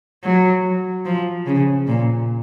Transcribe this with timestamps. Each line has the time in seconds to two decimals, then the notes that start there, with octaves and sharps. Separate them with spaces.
0.24 F#3
1.05 F3
1.46 C#3
1.87 A#2